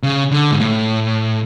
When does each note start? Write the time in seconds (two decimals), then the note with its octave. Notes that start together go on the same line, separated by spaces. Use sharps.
0.03 C#3
0.32 D3
0.51 G#2
0.60 A2